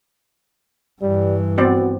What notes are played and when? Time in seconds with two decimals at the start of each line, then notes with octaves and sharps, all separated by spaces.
1.02 G2 E3 G3
1.58 B3 C4 F#4 D5